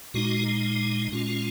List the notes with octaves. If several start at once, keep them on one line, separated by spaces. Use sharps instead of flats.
A#2 G#3 D#4 F#4
A#2 G#3 C#4 F4 F#4
F#4